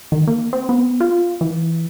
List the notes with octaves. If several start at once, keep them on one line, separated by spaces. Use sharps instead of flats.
D#3
A#3
C4
B3
F4
E3